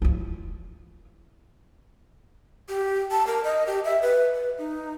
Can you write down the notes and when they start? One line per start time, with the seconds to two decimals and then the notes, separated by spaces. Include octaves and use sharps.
0.02 E4 F4
2.69 G4
3.11 A5
3.27 A#4
3.44 D#5
3.67 G4
3.85 E5
4.02 B4
4.34 B4
4.58 D#4